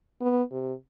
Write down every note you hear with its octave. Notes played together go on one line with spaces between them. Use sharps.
B3
C3